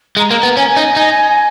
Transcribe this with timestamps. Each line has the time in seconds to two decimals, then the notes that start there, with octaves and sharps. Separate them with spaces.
0.17 G#3 A#5
0.31 A#3
0.43 B3
0.57 C#4 G#5
0.77 D#4
0.96 D#4